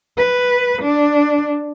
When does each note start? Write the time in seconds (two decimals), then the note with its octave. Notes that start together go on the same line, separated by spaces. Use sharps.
0.17 B4
0.83 D4